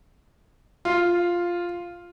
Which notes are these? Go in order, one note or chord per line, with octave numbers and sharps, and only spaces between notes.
F4